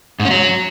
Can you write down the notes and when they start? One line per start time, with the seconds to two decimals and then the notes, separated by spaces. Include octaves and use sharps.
0.19 G#2
0.25 C#4
0.31 F#3